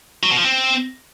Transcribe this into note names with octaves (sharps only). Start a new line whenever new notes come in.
F#3
B2
F3
C4